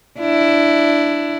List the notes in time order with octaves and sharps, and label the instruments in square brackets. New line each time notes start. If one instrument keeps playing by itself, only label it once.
[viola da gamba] D4 E4